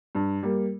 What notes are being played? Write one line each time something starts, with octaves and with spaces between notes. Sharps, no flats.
G2
G3 A#3